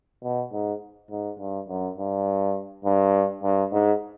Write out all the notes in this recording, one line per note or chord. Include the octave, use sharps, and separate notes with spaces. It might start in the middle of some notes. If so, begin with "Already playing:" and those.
B2
G#2
G#2
G2
F#2
G2
G2
G2
G#2